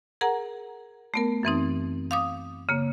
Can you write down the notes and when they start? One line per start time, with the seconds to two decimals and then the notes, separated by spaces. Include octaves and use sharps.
0.21 G#4 A#4 F#5 A#5
1.14 A3 B3 A#4
1.43 F#2 E3 C4 D#4
2.11 F5 D6 D#6
2.69 C#3 A#3